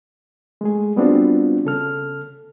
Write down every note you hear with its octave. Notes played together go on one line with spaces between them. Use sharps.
G#3 A3 G#4
G3 B3 C4 D4 F4 F#4
C#3 A4 F6